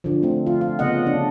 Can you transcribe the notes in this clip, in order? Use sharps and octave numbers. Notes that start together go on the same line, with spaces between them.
D3 F3
A3 C4
F4
F4
C#3 B3 D#5 F#5
D4